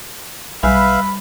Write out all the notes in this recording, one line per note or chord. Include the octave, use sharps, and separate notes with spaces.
B1 G3 B4 E5 F5 G#5 B5